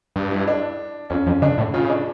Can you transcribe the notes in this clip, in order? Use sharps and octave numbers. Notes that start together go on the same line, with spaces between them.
G2
E4
D4
F2 C#4
F2 C#4
C#3 D4
A2
C#3 F4
D4